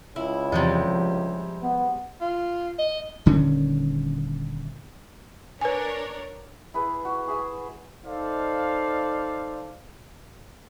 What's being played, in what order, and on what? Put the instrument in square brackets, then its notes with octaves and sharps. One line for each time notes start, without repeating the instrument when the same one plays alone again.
[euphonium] C#2 [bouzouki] E4
[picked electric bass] E2 E3 F3 [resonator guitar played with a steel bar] C3 G3 G#3
[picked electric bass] F3
[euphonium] B3
[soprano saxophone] F4
D#5
[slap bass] D#1 D3 D#3 C#4
[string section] D4 A#4 C#5 [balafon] B4 G#5
[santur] E4 G#4 B4
F#4
G#4 E5 G#5
[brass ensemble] D#4 A4 C5 D5 F5